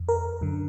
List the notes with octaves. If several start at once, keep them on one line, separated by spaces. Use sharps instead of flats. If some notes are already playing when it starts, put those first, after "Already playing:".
Already playing: F2
A#4
F#2 D3